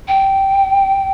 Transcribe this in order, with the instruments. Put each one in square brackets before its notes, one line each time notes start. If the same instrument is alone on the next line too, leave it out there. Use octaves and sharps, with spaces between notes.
[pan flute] G5